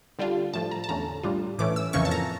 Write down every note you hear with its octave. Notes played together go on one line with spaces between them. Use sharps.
D3 G3 D4 F4
A2 F3 A3 A5
A#5
A5
E2 D3 A3 C#4 A#5
A2 G3 D4 F4
A2 E3 A3 C#4 D6
E6
F2 C#3 E3 A#3 C#4 C#6
A5
A#5